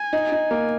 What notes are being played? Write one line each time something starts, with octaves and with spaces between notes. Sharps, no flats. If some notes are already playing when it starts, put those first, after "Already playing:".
Already playing: G#5
D#4
D#4
A#3